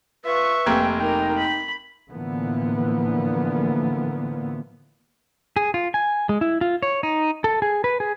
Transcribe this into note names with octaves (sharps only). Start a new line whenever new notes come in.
F4 B4 E5 C#6
F1 A#3 G5 G#6
D#4 A#4 G5
B5
A2 D3 E3 F3 A#3 B3
G#4
F4
G#5
G#3
E4
F4
C#5
D#4
A4
G#4
B4
G#4